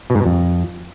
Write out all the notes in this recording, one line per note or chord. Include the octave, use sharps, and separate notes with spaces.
B2
G#2
B2
F2